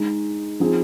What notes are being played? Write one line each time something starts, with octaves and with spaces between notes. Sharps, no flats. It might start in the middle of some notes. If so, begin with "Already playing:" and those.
Already playing: G#3 D#4 G#4
F3 C4 D#4 G#4